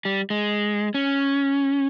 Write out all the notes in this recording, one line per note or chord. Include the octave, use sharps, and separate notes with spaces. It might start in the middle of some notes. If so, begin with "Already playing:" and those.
G3
G#3
C#4